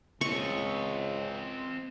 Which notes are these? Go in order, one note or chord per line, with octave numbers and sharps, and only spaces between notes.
C#2 C4 D#5 C#6